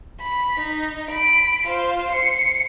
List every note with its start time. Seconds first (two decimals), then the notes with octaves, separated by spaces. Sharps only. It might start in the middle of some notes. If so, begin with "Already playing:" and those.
0.21 B5 B6
0.59 D#4
1.10 B5 D7
1.67 F4 C5
2.12 C7 C#7